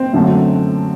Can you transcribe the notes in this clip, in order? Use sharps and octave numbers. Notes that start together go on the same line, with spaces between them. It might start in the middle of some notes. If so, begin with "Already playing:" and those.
Already playing: C4
F#2 D3 F#3 A3